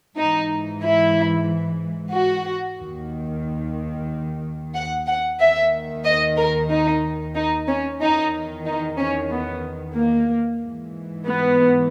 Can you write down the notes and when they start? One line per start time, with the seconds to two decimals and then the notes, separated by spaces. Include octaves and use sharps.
0.16 G#2 E3 D#4
0.82 E4
2.13 F#4
2.78 D#2 D#3
4.74 F#5
5.07 F#5
5.40 D#2 D#3 E5
6.04 D#5
6.37 A#4
6.70 D#4
7.35 D#4
7.67 C#4
8.00 E2 D#3 D#4
8.65 D#4
8.98 C#4
9.31 B3
9.95 A#3
10.61 G#2 E3
11.26 B3